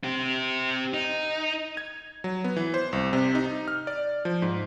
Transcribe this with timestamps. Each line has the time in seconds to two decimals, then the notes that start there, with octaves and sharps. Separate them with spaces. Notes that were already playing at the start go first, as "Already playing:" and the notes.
0.04 C4 G4
0.94 D#4
1.77 G#6
2.24 F#3
2.44 B3
2.56 E3
2.74 C5
2.93 C2
3.13 C3
3.35 D#4
3.68 F6
3.87 D5
4.25 F3
4.42 G#2